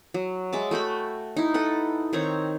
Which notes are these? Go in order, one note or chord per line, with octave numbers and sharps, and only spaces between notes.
F#3
G#3 E5 A5 D6
A3 F#4 G5 B5
D#4 E4
A4 B4 F#5
D#3 C4 C#5 A#5